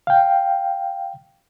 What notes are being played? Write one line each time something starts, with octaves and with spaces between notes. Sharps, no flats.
F5 G5